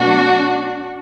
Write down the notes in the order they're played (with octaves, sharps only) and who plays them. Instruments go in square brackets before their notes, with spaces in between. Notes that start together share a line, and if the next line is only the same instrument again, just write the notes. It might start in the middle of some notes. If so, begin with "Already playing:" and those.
Already playing: [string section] B2 F#3 A3 D4 F#4